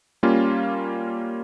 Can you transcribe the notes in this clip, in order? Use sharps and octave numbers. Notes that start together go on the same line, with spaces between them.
G3 A#3 C#4 F4